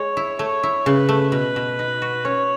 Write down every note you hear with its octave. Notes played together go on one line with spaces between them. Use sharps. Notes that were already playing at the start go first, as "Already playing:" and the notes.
Already playing: G#3 C#5
E4
A3 C#5
E4
C#3 B4
A3
B2 B4
B2
D#4
F#4
C#4 C#5